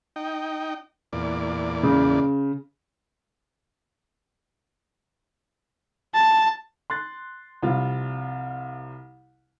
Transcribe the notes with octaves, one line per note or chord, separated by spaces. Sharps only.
D#4 G5
E2 A#2 D5
C#3
A5
C6 F#6 A6
C2 F3 G3 C4 F4